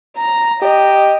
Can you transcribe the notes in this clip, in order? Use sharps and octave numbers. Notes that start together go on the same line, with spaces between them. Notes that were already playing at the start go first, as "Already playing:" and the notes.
A#5
G4 D#5